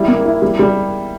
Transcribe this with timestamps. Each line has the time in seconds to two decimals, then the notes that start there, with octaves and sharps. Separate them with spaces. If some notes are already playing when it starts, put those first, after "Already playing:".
Already playing: G3 E4
0.08 A#3
0.25 E4
0.42 G3
0.59 G3